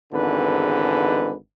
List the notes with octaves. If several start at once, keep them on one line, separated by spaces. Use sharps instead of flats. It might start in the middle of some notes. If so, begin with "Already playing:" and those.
G#1 E2 G#2 D3 B4